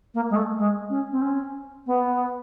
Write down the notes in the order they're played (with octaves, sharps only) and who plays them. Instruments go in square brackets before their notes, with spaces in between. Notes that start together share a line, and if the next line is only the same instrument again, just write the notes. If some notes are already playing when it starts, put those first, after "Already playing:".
[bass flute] A#3
G#3
A3
G#3
C#4
C4
C#4
B3